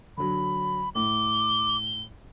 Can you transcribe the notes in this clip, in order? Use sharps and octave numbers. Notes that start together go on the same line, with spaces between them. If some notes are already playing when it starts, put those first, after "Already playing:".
D3 F#3 B5
A2 D6 G7